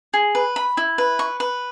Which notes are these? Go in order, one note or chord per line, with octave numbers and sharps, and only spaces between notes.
G#4
B4
B5
E4
B4
C#6
B4